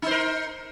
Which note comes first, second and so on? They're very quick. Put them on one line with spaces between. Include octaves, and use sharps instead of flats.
D#4 C5 A#4